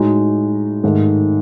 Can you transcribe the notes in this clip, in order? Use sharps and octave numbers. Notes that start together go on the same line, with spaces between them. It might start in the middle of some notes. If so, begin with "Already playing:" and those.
Already playing: A2 G#3 D#4 F#4
G#2 D#3 A3